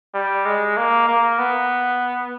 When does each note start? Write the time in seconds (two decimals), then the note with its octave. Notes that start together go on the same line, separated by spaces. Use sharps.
0.14 G3
0.46 G#3
0.77 A#3
1.08 A#3
1.39 B3